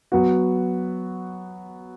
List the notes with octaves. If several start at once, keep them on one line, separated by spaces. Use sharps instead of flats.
F#3 B3 F#4